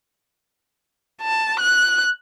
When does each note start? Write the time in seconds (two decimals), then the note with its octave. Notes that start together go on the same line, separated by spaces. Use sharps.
1.22 A5
1.59 F#6